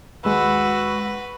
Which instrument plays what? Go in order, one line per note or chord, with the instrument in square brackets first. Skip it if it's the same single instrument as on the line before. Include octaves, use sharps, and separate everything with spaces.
[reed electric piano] D#2 G#3 [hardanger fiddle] F#4 [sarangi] B4 [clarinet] E6